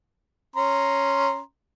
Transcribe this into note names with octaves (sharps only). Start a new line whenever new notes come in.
C#4 A#5 C6